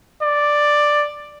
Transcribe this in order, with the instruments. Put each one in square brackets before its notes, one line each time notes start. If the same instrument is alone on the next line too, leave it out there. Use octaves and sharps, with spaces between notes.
[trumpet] D5